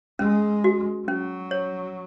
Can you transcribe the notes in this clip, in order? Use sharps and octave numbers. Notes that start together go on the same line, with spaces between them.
G#3 C#4
F#4
F#3 C#4
C#5